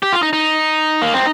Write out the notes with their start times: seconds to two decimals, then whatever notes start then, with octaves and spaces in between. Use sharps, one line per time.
0.03 G4
0.13 F4
0.23 D#4
0.33 D#4
1.02 A#3
1.14 C4